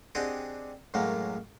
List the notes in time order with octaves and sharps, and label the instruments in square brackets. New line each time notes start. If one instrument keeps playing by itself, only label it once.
[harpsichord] C4 D4 G4 G#4 D#5 F#5
F#2 A2 F#3 G#3 A#3